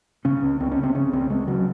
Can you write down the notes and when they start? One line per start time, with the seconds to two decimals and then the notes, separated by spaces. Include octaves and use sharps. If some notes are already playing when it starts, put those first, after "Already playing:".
0.25 C#3 C#4
0.43 C#2
0.60 C#2 C4
0.72 C#4
0.77 C#3
0.83 C4
0.95 C#3 C#4
1.13 C#2 C4
1.30 C#2 G#3
1.48 C#3 F#3